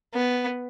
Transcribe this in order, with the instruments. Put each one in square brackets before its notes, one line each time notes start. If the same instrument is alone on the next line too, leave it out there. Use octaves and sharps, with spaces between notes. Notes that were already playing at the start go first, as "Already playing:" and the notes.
[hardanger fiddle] B3